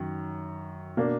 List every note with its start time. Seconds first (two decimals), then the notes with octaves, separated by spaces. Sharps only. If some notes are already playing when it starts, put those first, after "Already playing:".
Already playing: F#2 D#3
0.97 B2 A#3 D4